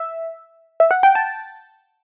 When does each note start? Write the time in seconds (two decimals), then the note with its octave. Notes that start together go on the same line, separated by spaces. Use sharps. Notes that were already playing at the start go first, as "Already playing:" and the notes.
Already playing: E5
0.80 E5
0.91 F#5
1.03 G5
1.15 A5